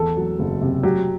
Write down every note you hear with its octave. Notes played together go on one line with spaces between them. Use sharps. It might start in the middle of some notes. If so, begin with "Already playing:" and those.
Already playing: E2 A4
F#3
F#1
C3
F#3 G4